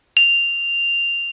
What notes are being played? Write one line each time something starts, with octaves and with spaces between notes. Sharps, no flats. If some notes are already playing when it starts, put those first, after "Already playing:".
F7